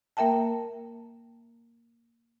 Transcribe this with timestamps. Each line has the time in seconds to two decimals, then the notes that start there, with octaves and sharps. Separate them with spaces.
0.17 A#3 A#4 E5 G5 A5